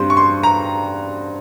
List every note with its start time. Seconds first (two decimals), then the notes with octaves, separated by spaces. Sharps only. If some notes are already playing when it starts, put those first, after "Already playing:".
Already playing: G2 G3 C4 C6
0.10 C#6
0.17 C6
0.43 A#5